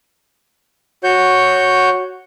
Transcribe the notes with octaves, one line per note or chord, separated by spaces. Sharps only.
F#4 C#5 G6